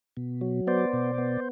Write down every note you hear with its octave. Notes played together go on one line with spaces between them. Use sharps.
B2
F#3
B3 C5 D5
B2
B3